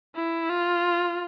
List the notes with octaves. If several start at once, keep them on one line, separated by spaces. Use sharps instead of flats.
E4
F4